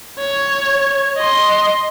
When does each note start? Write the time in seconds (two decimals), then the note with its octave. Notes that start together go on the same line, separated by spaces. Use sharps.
0.19 C#5
1.17 D#5 C6